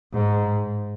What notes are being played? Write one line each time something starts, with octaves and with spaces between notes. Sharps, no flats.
G#2